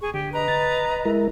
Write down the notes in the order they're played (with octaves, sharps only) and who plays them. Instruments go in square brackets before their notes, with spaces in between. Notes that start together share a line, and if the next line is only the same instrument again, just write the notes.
[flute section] G#4 C#6
[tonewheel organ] D3 [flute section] G4
[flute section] B4 D#5 A#5
[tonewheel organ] A6
G#3 E4 A#4